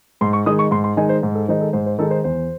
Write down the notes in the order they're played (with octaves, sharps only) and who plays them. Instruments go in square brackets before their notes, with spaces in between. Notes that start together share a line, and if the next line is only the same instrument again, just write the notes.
[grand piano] G#2 C6
C#6
D#3 G#3 D#4 D#6
C#6
G#2 C6
C6
D#3 G#3 D#4 G#5
C5
G#2 C5
A4
D#3 G#3 D#4 C5
A4
G#2 C5
C5
D#3 G#3 D#4 A4
C5
E2 C5